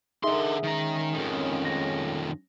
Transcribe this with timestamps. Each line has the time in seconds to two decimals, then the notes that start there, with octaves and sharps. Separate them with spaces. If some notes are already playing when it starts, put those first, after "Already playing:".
0.24 D3 D#4 G#4 A#4 E5 C6
0.64 D#3 G#3 C#4 A#5
1.14 F2 D#3
1.65 A#6